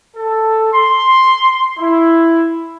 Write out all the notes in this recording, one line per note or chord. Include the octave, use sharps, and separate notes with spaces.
A4
C6
E4